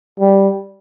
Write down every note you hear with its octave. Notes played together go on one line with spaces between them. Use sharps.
G3